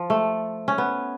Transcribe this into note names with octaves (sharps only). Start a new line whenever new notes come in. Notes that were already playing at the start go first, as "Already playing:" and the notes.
Already playing: F3
A3
C#4
B3